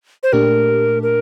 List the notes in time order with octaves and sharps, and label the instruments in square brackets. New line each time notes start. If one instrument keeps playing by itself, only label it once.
[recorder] C5
[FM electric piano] A#2 A3 D4 G4 [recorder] A#4
[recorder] A#4